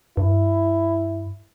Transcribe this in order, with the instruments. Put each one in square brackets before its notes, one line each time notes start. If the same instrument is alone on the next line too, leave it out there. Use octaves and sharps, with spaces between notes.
[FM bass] G2 [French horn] E4